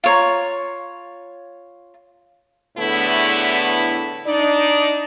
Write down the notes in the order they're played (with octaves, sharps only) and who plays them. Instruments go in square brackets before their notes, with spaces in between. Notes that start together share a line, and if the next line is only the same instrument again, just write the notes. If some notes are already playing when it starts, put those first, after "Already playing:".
[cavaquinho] F4 C#5 A#5
[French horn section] E2 A2 D3 A3 B3 E4
D4 D#4 D5